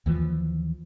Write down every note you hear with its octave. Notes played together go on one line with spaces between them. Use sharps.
D#2 E3 F3